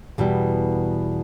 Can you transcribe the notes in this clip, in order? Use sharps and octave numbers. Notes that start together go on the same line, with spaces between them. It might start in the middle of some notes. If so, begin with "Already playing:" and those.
E2 B2 G3